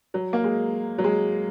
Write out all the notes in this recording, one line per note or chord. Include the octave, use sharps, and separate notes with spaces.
F#3
A#3
G#3
F#3
G#3